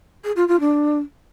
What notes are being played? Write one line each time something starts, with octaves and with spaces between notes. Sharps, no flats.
G#4
F4
F4
D4